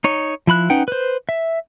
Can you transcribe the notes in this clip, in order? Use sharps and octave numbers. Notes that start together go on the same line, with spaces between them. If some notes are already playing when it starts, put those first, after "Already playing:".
D#4 C#5
F3 E4 B5 F#6
C#4 D#4 B4 F#5 G5
B4 C5
E5